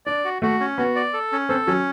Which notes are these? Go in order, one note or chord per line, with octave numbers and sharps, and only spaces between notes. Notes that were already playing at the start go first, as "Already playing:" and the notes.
D4 D5
F#4
A3 F#4
C#4
B3 F#4
D5
A4
C#4
C4 A4
F#3 C#4